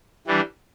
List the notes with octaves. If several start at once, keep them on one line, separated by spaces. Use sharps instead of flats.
E3 G3 D4